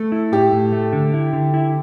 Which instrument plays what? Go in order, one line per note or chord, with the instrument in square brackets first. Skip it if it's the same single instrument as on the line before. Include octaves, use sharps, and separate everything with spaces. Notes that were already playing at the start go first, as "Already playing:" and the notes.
Already playing: [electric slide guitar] A3 [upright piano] A4
[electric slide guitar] E4
[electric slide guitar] A2 [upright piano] G4
[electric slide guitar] A2
A3
D3
E4
D3
E4